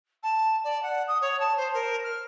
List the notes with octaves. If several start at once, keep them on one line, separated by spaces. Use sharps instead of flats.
A5
D5
F#5
D#6
C#5
A5
C5
A#4
F6